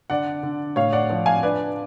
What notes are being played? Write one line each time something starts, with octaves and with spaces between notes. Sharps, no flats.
D3 D5 F#5
D3
A2 C#5 F5
D5 F#5
F3
F5 G#5
D4 B4 D5